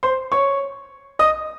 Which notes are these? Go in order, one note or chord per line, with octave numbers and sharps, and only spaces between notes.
C5 C6
C#5 C#6
D#5 D#6